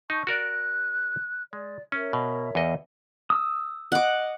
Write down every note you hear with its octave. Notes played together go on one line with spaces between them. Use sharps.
D#4 A5 C#6 G6
F#4 A#4 D5 F#6
G#3 D5
C#4 A#4 C#5 E5
B2
E2 D#5
D#6 E6
D#5 F#5 D6